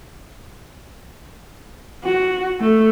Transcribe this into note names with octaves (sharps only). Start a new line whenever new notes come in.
F#4
A3